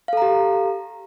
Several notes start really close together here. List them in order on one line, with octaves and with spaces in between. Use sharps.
F5 A4 A#5 G4